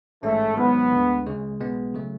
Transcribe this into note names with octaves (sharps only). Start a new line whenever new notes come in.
A1 G#2 G#3 A3 C#4
G#1 G#2 F#3 B3
D2 D3 G#3
C#2 C#3 G#3
B1 B2 G#3 B3
C#3 F#3 A3